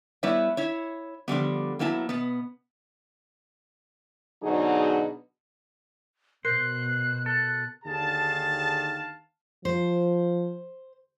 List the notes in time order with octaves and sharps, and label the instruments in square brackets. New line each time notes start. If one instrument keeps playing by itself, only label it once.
[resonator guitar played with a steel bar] G3 B3 E4 B4 C#5 E5
E4 C#5
D3 F3 G3 B3
F#3 A#3 B3 E4 G#5 A5
B2 B3
[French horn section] B2 D3 F#3 D#4 F#4 G#4
[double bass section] B2 [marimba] A#4 [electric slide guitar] C5 [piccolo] F#6
[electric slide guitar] A4 [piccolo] F#6
[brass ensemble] D#2 D3 D#3 G#4 F5 A5
[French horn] F3 [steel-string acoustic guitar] C5